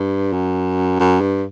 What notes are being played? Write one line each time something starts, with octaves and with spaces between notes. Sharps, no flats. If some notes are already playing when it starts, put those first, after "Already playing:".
Already playing: G2
F#2
F#2
G2